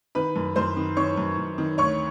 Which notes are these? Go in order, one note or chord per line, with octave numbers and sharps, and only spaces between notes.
D#3 B4 B5
F#2
F#2 C5 C6
D#3
D#3 C#5 C#6
F#2
F#2
D#3
D2 C#5 C#6